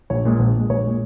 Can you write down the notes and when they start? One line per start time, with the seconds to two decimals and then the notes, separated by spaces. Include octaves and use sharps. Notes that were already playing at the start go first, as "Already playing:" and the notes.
0.10 A#1 C#5
0.25 A#2 G#3
0.39 A#1
0.55 A#2 G#3
0.69 A#1 C#5
0.85 A#2 G#3